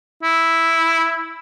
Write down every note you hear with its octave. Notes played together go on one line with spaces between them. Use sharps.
E4